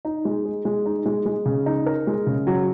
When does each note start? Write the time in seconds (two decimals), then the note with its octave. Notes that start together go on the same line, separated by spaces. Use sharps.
0.05 D#4
0.25 G#3
0.45 G#4
0.65 G#3
0.86 D#4
1.06 G#3
1.26 G#3
1.46 C#3
1.66 D#4
1.86 A#4
2.07 G#3
2.27 C#3
2.47 F#3